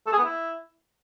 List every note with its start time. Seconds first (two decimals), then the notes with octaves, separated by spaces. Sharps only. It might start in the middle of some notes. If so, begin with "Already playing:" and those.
0.07 A4
0.13 G#4
0.18 B3
0.24 E4